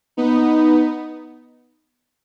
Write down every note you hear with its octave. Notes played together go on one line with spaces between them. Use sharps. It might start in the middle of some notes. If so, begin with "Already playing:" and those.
B3 D#4